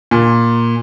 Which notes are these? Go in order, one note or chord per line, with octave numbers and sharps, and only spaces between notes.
A#2